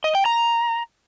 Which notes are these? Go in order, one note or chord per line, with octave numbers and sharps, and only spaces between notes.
D#5
G5
A#5